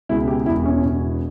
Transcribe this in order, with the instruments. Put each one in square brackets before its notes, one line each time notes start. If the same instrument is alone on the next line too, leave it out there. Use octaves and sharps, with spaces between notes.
[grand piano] C#2 B2 G#3 E4
G4
E1 E2 B2 E4
C#4
E1 E2 B2